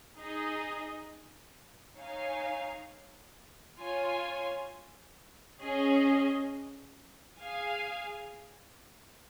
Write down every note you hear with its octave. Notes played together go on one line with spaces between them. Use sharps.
D#4 G#4 D#5
D#4 C#5 F5 G#5
F4 C#5 G#5
C#4 G#4 D#5
G#4 F5 G#5